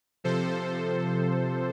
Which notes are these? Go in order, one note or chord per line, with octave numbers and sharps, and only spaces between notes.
C3 F3 A4 C5